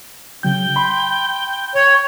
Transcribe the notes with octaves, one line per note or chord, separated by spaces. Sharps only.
C#3 F#3 G5 G6
B5 C6
C#5